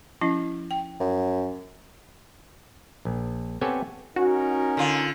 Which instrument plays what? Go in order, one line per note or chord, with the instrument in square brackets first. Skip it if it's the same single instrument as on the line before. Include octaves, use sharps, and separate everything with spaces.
[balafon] F3 C#4 E4
G5
[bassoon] F#2
[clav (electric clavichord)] A#1
B3 C4 G4 A4 C#5 G#5
[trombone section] C#4 D#4 A#4 [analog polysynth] F#4
[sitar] D3 F4